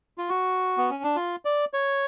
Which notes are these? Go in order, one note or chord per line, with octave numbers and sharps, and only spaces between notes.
F4
F#4
B3
C#4
D4
F4
D5
C#5